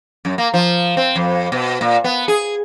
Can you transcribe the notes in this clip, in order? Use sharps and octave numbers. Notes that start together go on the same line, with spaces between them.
F#2
A#3
F3
C4
F2
B2
A#2
B3
G#4